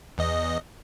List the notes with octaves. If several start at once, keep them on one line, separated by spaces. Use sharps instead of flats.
E2 D#5